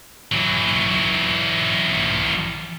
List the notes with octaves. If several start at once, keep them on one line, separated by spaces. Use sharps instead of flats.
E3 F#3